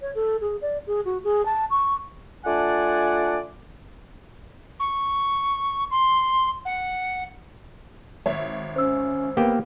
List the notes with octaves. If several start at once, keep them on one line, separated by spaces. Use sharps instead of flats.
C#5
A4
G#4
D5
G#4
F#4
G#4
A5
C#6
A3 D4 F4 D5 F#5 G#5
C#6
C6
F#5
G#1 C#5 E5
C#4 C5 E6
A#3 B3 G4 G5